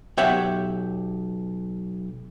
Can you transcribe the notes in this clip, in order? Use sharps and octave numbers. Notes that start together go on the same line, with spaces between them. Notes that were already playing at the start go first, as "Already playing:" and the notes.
B1 G4 C#5 E5 F#5